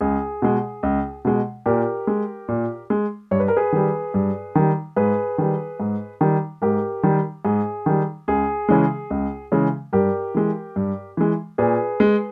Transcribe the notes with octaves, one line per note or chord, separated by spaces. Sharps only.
C#2 G#4
B2 G#3
C#2
B2 G#3
A#2 G4 A#4
G#3
A#2
G#3
G2 C#5
B4
A#4
G#4 B4
D#3 G3
G2
D#3 G3
G#2 G#4 B4
D#3 G3
G#2
D#3 G3
G#2 G4 A#4
D#3 G3
G#2 G#4
D#3 G3
C#2 G#4
C#3 E3 G#3
C#2
C#3 E3 G#3
G2 G4 A#4
E3 G#3
G2
E3 G#3
A#2 G#4 B4
G#3